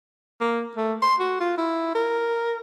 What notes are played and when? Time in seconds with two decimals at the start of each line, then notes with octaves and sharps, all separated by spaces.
0.41 A#3
0.77 A3
1.02 C6
1.20 F#4
1.40 F4
1.58 E4
1.95 A#4